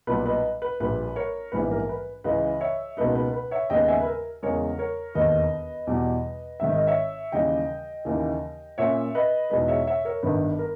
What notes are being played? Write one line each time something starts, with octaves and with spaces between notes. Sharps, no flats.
B1 A#2 G3 B4
B4 D#5
B4
A#1 A#2 G3 B4
A#4 C#5
A#1 G#2 E3 G3 B3 B4
A#4
B4
C#2 C#3 E3 B4 D#5
C#5 E5
C#2 B2 A#3 D#4 B4 D#5
B4
B4
C#5 E5
D#2 C#3 G#3 B3 D#5 G5
E5 G#5
B4
A#4
E2 C#3 G#3 A#4 C#5
A#4 C#5
E1 D#2 D#3 B4 D#5
E2 B2 G3
G#1 G#2 D#3 E5
D#5
C#5 E5
D#2 C#3 E3 G3 D#5 G5
D#2 C#3 E3 A#3 D#4
A#2 A#3 C#4 C#5 E5
B4 D#5
E2 B2 G#3 D#4 B4 D#5
C#5 E5
C#5 E5
A#4 C#5
G1 G2 D#3 B4
A#4